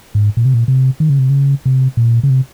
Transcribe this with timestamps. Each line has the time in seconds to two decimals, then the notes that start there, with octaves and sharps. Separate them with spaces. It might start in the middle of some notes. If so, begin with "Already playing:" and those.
0.15 G#2
0.37 A#2
0.45 C3
0.54 A#2
0.68 C3
1.00 D#3
1.10 C#3
1.19 C3
1.30 C#3
1.66 C3
1.97 A#2
2.23 C#3
2.30 C3